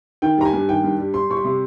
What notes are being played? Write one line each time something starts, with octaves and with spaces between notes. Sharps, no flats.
D#3 G5
G3 A#5
G#5
G2
D#3 G5
G2
G3
G3 C6
G3 C#6
C6
C3